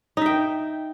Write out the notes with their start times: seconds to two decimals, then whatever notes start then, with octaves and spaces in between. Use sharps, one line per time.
0.17 D#4
0.21 E5
0.26 G5